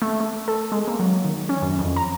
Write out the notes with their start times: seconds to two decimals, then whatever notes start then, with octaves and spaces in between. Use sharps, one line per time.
0.02 A3
0.20 A3
0.48 A4
0.72 G#3
0.88 A#3
1.00 F#3
1.25 D#3
1.49 C#4
1.62 F#2
1.79 F2
1.96 A#5